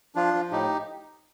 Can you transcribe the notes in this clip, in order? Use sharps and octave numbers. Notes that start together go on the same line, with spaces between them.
F3 D4 F4
F3
A2 D#4 G4